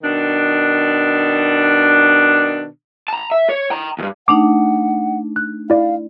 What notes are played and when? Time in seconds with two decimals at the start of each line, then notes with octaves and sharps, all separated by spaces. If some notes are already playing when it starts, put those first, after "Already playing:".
0.03 B2 D#3 D4
3.08 A5 A#5
3.31 E5
3.49 C#5
3.70 G5 A#5
3.99 D2 G2
4.28 A3 D4 D#4 F#5 D6
5.36 F#6
5.70 E4 D5 F5